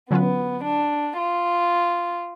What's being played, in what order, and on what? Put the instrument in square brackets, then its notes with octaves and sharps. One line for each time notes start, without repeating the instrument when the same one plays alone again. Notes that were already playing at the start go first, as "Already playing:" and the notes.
[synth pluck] D3 F#3 C#4 F4 B4 [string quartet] B3
[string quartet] D4
F4